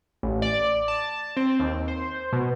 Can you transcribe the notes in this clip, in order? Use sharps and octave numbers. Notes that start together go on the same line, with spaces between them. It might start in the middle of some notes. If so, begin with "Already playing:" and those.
A1
D5
A5
C4
D#2
C5
B2